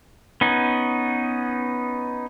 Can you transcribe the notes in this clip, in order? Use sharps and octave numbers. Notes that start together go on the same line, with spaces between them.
B3 C#4 D#4